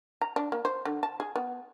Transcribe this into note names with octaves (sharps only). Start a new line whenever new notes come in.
A#5
D4
A#3
C5
D3
A5
G#4
B3